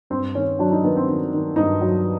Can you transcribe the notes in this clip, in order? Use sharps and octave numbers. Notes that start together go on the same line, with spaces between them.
G2 C4
D#3 C#4
F#3 D4
D#4
D#3 B3
C4
D#3
D#3
G2 D#4
F#3